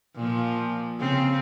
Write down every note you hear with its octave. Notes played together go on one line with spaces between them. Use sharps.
A#2 F3
C#3 C4